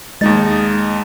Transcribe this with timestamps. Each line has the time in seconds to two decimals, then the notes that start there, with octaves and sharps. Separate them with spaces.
0.21 D#2 G#3 D#4 D#5 A6